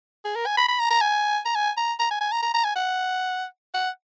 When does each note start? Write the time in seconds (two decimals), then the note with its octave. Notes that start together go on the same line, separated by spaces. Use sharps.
0.25 G#4
0.35 A#4
0.46 G#5
0.57 B5
0.68 B5
0.79 A#5
0.91 A#5
1.01 G#5
1.45 A#5
1.55 G#5
1.77 A#5
1.99 A#5
2.11 G#5
2.21 G#5
2.32 A#5
2.43 A#5
2.54 A#5
2.64 G#5
2.76 F#5
3.74 F#5